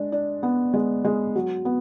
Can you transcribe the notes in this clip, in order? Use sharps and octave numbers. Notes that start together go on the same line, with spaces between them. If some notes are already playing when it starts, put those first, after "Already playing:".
Already playing: G#3 D4
D4
B3
G#3
G#3
F#3
B3